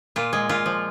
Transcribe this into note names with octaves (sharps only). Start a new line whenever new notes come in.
A#2 F4
G#3
A#2 F4
F3